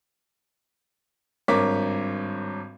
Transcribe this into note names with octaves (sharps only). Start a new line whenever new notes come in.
G#1 G2 A#4 C#5 D6 B6